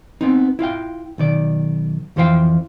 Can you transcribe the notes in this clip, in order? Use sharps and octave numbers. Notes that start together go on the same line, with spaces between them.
B3 C4 D#4
E4 F4 F5 G5
B1 D#3 D5
F2 E3 F3 C5 F5 G5